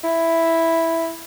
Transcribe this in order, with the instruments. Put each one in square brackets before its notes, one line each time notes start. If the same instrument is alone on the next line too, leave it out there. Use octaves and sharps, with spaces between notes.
[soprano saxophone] E4